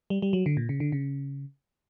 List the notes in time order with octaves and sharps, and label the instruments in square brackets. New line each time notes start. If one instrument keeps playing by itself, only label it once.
[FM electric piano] G3
G3
F#3
D3
A#2
C#3
D3
C#3